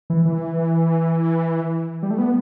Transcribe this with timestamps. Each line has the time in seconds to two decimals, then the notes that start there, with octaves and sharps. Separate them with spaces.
0.10 E3
0.25 E3
2.03 G3
2.11 A3
2.18 B3